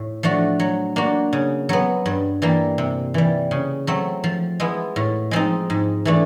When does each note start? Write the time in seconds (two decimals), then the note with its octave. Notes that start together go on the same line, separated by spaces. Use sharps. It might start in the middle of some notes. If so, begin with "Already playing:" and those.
Already playing: A2
0.23 F3 A3 D4 F#4
0.60 F#3
0.96 A#3 D4 F#4
1.33 C#3
1.69 F#3 B3
2.06 G2
2.42 E3 G3 A#3
2.78 C3
3.14 E3 G3
3.51 C#3
3.87 F#3 A3 C4
4.24 F3
4.60 G#3 B3 E4
4.96 A2
5.31 F3 G#3 C4 D#4
5.70 G#2
6.05 E3 A3 D4